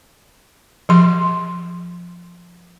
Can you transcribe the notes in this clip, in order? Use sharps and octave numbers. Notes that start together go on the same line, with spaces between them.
F3 C6